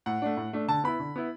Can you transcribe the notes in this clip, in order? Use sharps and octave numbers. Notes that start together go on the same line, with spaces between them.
A2 F#5
A3 D4
A2
A3 D4
D3 A5
B3 E4 B5
D3
B3 E4